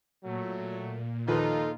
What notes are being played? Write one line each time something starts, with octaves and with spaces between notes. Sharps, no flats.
A#2 F#3 A3
D#2 F3 D#4 F4 A4 B4